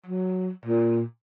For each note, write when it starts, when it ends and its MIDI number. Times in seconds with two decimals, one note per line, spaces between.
0.07 0.49 54
0.66 1.02 46